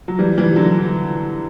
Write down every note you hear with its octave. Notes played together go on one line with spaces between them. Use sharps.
F#3
E3 G3
E3 G3
D3 F#3